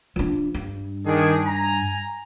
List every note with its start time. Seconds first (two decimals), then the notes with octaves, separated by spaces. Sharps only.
0.16 F3 D4
0.54 G2
1.06 D#3 D4 G#4
1.44 G#5 A#5